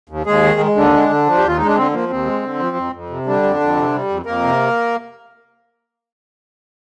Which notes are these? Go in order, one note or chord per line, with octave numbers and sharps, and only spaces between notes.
D#2
D#2 G#3 G#4
D#3
G#3
D#2 D3 D4
G#3
D3
F3
G4
D#2 F4
G#3 D#4
D4
D3 C4
F3 A#3
D#2 C4
G#3
D3
F3
F2
F2
C3
D3 G3 D4
F2
F2
C3
G3
F2
F2 A#3 A#4
C3